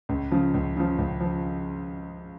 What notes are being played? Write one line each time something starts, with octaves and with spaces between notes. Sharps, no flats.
C#2
C#3 F3
C#2
C#3 F3
C#2
F3